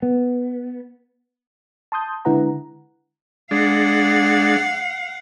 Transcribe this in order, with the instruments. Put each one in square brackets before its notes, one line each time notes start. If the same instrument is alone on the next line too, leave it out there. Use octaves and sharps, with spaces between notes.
[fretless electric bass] B3
[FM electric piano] A5 C6 D#6 G6
D3 G#3 E4 B4 F#5 A#5
[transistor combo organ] G#3 D4 [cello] F5 F#5